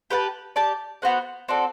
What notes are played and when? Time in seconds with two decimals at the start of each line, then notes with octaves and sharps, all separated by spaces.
0.10 G4 B4 F#5 A5
0.56 G4 D5 A5
1.02 B3 F#4 C5 F#5
1.48 C4 F#4 A4 D5